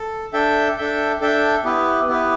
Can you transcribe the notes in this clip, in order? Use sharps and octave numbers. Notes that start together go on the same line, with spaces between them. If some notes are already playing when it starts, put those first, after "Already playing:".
Already playing: A4
D4 A4 E5 G5
D4 A4 E5 G5
D4 A4 E5 G5
B3 E4 G4 B4
B3 E4 G4 B4